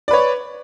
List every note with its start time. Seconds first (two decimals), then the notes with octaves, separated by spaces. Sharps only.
0.08 D5
0.11 B4
0.13 C#5